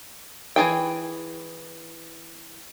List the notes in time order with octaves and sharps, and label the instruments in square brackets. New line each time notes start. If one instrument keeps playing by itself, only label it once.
[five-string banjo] E3 F4 G#4 G5